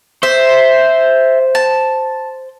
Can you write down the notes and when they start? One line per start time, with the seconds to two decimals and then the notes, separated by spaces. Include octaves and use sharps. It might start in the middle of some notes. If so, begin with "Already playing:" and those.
0.23 C5 E5
1.55 A5